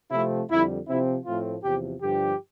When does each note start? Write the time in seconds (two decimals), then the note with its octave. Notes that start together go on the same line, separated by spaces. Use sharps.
0.11 C3 F3 A3 C4 E4
0.49 F2 D3 G3 E4
0.88 C3 F3 C4 E4
1.25 A2 F3 A3 C4 F4
1.64 E2 C3 F3 G4
2.02 G2 D3 F3 G4